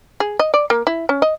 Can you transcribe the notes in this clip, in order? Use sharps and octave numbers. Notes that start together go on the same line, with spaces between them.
G#4
D#5
D5
A#3
E4
C#4
D#5